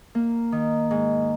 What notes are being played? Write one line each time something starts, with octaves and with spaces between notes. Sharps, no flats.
A#3
D#3
G#2